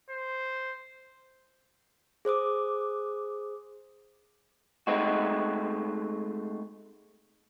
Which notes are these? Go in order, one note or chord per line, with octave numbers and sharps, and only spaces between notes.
C5
G#4 C5 D6 D#6
G#3 A3 C4 D#4 F#4